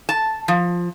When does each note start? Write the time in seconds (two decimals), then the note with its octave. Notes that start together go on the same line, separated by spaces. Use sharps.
0.09 A5
0.48 F3